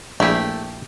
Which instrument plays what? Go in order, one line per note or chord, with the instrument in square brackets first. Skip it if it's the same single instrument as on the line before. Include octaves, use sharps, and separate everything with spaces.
[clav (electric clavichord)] A#1 E4 G#4 [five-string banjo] A3 G4